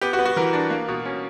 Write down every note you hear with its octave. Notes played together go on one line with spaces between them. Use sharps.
B3 G4
F#4
B3
F#4
E3 A#4
D4
A#3
B2
C#4